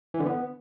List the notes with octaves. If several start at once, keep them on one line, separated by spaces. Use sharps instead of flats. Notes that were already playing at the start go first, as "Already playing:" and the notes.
E3
D3
B3